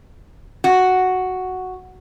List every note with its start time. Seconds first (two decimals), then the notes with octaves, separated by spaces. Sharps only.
0.64 F#4